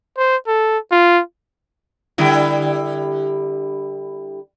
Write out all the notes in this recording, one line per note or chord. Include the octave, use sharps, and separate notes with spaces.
C5
A4
F4
D3 G3 E4